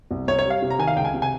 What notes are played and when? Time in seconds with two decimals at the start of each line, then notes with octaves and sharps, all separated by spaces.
0.11 C2
0.28 C2 C#5
0.39 C#5
0.45 G3
0.50 F5
0.62 C3
0.70 A#5
0.79 D#3 G#5
0.87 F5
0.96 C#2 G5
1.05 G#5
1.14 C3
1.22 G#5